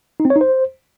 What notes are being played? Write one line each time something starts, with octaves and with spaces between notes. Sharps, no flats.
D#4
C4
C#5
D#4
C5